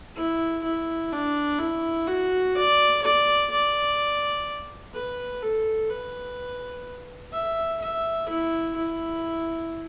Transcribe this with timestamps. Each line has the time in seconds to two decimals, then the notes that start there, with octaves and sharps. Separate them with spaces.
0.16 E4
0.64 E4
1.12 D4
1.59 E4
2.07 F#4
2.56 D5
3.02 D5
3.51 D5
4.94 B4
5.42 A4
5.90 B4
7.33 E5
7.81 E5
8.29 E4
8.76 E4